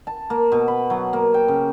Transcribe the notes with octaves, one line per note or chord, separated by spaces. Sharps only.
A5
A#3
B2
B5
F#3
A#3
G5
C#3